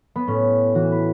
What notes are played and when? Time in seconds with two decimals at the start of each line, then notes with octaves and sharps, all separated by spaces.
0.16 B3
0.27 A2 C#4
0.75 E3 F#4
0.92 B4